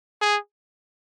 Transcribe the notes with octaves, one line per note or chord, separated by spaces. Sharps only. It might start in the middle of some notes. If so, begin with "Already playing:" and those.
G#4